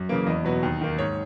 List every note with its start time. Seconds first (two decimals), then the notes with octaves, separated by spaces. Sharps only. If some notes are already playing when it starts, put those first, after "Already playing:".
Already playing: F#2
0.09 C#3 E3 A#3
0.27 E2 D#5
0.45 B2 F#3 B3
0.63 D#2
0.81 D#3 A#3
0.98 G#2 C#5